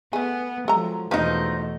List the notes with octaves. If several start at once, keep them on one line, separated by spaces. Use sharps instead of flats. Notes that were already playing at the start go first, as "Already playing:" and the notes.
A3 B3 G#4
F3 F#3 G#3 A4 A#5
E2 B2 F3 A3 A#3 D4 D#4 B4